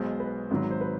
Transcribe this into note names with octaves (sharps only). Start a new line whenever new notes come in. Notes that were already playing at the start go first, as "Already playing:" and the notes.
Already playing: B1 B2 G#3 C5
B4
G#1 G#2 D#3 F#3
C5
B4